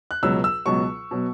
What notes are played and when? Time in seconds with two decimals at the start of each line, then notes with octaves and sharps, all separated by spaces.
0.11 F#6
0.23 C#2 B2 F#3 E6
0.44 E6
0.66 C#2 B2 F#3 C#6
1.11 B2 F#3